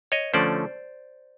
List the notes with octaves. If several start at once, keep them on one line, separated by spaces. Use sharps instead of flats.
C#5 D#5
D3 F3 A3 C#4 C5 D5